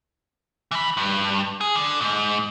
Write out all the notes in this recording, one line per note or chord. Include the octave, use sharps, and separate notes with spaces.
E3 B5
G2
G#4
D3
G#2